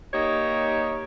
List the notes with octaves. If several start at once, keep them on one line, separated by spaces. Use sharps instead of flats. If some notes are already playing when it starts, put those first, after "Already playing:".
A#3 D#4 G4 C#5